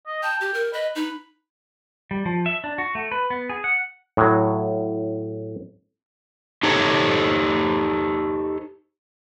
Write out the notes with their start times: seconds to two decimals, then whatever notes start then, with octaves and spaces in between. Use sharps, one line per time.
0.07 D#5
0.23 G5 A5
0.41 G4
0.54 A#4
0.73 B4 D#5
0.95 D#4 B4
2.11 G3
2.26 F3
2.46 E5
2.64 D4
2.78 F#4
2.95 A3
3.12 B4
3.30 B3
3.49 G#4
3.64 F#5
4.17 A2 F#3
6.63 D#4 G4 A4 C5 C#5